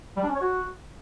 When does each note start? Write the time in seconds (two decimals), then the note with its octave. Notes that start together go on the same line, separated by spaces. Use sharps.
0.17 G3
0.23 D4
0.29 C#4
0.35 C#5
0.41 F#4